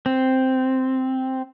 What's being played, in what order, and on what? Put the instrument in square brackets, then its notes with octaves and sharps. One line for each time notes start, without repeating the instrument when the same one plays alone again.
[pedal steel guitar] C4